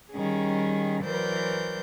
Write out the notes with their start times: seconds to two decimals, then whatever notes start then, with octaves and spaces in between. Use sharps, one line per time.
0.12 D#3 G3 C#4 G#4
1.03 E3 F#3 A#4 C5 D5 G6